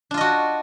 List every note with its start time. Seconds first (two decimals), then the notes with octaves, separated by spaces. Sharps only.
0.11 D4
0.14 F4
0.17 D#5
0.21 F#4